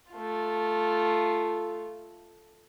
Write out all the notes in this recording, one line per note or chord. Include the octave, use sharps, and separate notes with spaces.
A3 F4